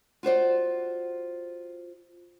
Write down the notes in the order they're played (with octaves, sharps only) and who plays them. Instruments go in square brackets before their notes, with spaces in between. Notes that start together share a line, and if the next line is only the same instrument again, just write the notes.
[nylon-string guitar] F4 F#4 C5 D5